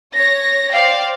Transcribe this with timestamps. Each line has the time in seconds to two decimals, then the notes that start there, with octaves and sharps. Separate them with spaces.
0.15 C#5 A#6
0.73 C5 D5 F5 G5